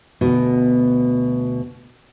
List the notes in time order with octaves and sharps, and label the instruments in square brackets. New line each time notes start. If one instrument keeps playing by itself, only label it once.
[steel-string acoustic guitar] D2 B2